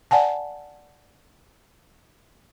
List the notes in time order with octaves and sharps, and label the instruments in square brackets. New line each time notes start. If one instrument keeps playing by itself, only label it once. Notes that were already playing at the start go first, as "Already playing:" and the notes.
[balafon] D5 F#5 G#5 A5